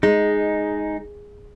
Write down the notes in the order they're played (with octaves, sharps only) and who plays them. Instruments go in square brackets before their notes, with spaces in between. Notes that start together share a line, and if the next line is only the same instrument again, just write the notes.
[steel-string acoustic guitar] G#3 [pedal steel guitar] D#4